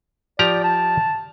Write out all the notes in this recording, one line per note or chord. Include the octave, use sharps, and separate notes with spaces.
F3 G4 D5 A#5
A5